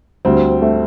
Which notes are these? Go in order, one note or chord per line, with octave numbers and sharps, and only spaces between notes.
D2 G3 C4
A3